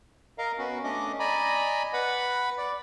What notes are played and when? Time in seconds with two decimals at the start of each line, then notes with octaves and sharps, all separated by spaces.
0.38 A#4 D#5 F5 A#5
0.58 B3 C#4 F#4
0.84 A3 C#4 D4 D#5 D6
1.20 D5 D#5 G#5 A#5 B5
1.93 B4 F#5 B5
2.58 D5 D6